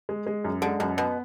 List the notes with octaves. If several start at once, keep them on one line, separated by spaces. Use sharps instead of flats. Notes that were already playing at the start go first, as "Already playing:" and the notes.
G#3
G#3
F#2
D3 G#3
F#2 B2
B2 B3